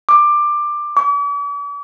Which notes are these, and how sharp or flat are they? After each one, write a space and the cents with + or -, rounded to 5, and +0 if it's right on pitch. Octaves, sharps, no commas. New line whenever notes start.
D6 +15
D6 -45